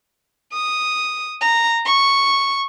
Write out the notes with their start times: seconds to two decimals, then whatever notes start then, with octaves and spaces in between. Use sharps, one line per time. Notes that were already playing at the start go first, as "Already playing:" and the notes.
0.53 D#6
1.41 A#5
1.85 C#6